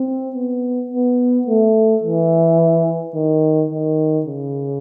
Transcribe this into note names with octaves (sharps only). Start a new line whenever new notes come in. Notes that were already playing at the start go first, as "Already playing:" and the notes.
Already playing: C4
B3
B3
A3
E3
D#3
D#3
C#3